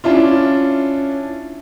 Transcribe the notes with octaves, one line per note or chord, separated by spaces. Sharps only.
C#4 D4 E4 F4